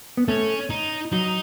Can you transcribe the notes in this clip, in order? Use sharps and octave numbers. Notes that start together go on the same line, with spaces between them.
B3
A3 C#4
D#4
F#3 D#4